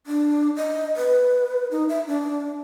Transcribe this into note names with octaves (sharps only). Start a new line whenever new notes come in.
D4
D#5
B4
D#4
E5
D4